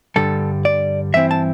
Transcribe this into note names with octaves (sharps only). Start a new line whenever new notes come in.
G2 D3 G3 A4
D5
G2 E3 C4 E4 E5
A5